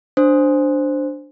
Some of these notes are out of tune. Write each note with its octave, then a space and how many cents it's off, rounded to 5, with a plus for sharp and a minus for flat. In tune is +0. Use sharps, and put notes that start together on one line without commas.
D4 +0 C5 +0